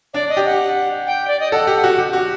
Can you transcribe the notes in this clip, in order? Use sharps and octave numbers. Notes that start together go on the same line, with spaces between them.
D4 D5
D#5
G4
F#5
G5
D5
D#5
A4 F#5
G4
F#4
G4
F#4